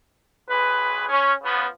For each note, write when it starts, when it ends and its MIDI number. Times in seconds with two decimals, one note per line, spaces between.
0.48 1.05 35
0.48 1.05 68
0.48 1.05 71
1.09 1.32 61
1.42 1.65 49
1.42 1.65 53
1.42 1.65 59